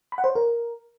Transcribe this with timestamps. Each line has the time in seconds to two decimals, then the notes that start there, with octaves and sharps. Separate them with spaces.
0.12 B5
0.18 F#5
0.24 C5
0.30 C#5
0.35 A#4